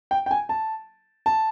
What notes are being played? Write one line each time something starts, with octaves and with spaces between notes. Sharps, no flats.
G5
G5
G#5
A5
A5